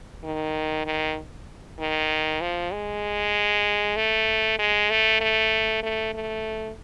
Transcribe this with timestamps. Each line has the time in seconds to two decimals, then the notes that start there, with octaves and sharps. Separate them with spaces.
0.24 D#3
0.86 D#3
1.79 D#3
2.41 F3
2.73 G#3
3.96 A3
4.59 G#3
4.90 A3
5.21 A3
5.83 A3
6.14 A3